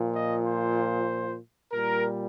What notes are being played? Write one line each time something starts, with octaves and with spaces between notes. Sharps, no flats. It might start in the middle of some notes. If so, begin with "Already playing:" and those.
Already playing: A#2 F3
D#5
C5
A#2 G3 A#4